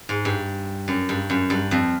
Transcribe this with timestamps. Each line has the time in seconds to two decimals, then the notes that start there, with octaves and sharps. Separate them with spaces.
0.09 G#2
0.25 G2
0.88 F#2
1.09 G2
1.30 F#2
1.50 G2
1.71 F2